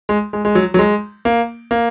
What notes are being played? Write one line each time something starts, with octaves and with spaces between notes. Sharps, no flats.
G#3
G#3
G#3
F#3
F#3
G#3
A#3
A#3